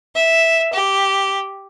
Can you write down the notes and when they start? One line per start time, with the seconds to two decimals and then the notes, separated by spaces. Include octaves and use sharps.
0.16 E5
0.73 G4